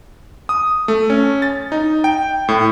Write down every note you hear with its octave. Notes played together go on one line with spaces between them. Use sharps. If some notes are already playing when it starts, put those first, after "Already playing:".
D#6
A3
C#4
A6
D#4
G5
A2